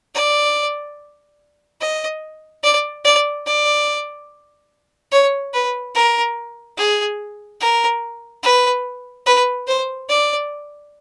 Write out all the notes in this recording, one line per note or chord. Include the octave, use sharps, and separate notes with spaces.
D5
D#5
D5
D5
D5
C#5
B4
A#4
G#4
A#4
B4
B4
C5
D5